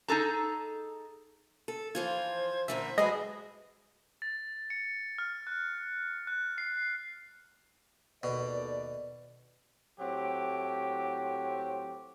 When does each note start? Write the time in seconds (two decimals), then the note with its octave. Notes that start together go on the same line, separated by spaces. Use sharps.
0.08 D#4 G#4 A4 A#5
1.68 A4
1.95 E3 F3 F4 C5 G#6
2.68 A#2 D3 E3 E5
2.98 F#3 G#3 F#4 G#4 A4 B4 D#5
4.22 A6
4.70 C#7
5.18 F6
5.47 F#6
6.27 F#6
6.58 C7
8.23 D#2 B2 A4 D5
9.98 A2 F#3 C4 G4